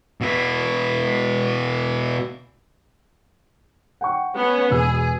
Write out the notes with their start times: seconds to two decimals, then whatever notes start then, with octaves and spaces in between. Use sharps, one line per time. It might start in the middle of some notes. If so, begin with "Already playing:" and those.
0.21 B2 E4
4.01 F#5 G5 C#6
4.36 B3 C#4
4.70 E1 B2 G#4 E6